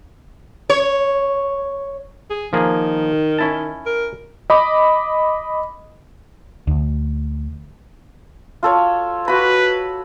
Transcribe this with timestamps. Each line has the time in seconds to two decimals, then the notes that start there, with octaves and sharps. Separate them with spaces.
0.70 C#5
2.30 G#4
2.53 D#3 F3 A#3 G#4
3.39 C#4 E4 A5
3.86 A#4
4.50 D#5 B5 D6
6.67 D2
8.63 F4 A4 C#5
9.28 F#4 B4 B5